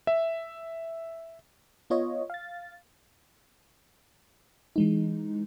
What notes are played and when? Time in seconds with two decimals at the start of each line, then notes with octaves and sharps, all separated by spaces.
0.07 E5
1.90 B3 F4 C#5 D#5
2.30 F5 A6
4.76 E3 G#3 D#4